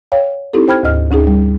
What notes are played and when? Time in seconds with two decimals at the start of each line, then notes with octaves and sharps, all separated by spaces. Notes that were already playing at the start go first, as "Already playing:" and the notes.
0.12 C#5 F5 G5
0.53 C4 D#4 E4 G4 A4
0.68 C5 G5 B5 F6 G#6
0.83 D2 G#2 D#5 F6
1.11 D2 C#4 D#4 G#4
1.27 G3